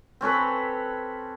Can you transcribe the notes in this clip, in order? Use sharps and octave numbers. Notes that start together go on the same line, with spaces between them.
C4 C#4 A4 B4